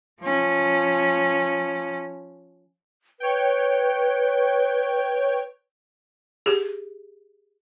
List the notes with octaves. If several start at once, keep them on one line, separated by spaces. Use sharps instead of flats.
F3 C#4
B4 C#5 G5
G4 G#4